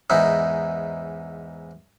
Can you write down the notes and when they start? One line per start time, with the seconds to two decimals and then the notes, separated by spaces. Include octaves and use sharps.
0.10 E2 G#2 D#4 E4